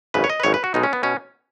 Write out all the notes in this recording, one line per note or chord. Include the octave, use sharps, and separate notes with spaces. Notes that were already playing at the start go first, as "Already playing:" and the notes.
G#1 F#2 C#3 B4
C#5
D#5
B4
G#1 F#2 C#3 C#5
B4
F#4
B1 B2 G#3 D#4
C#4
B3
B2 C#4